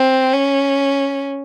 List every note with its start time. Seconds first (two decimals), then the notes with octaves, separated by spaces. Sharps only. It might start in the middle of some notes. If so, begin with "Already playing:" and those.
Already playing: C4
0.33 C#4